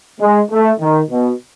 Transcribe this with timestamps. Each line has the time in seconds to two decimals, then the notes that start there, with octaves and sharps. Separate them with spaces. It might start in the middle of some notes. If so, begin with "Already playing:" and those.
0.20 G#3
0.51 A3
0.80 D#3
1.11 B2